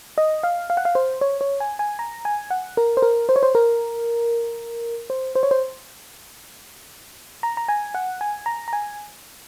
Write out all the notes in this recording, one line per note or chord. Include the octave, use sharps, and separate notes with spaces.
D#5
F5
F5
F#5
F5
C5
C#5
C#5
G#5
G#5
A#5
G#5
F#5
A#4
C5
A#4
C5
C#5
C5
A#4
C5
C5
C#5
C5
A#5
A#5
G#5
F#5
G#5
A#5
A#5
G#5